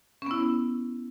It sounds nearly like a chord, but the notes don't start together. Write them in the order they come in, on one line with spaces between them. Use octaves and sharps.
C#4 B3 E4